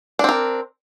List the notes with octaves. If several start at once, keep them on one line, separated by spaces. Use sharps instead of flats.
C4 D4 A#4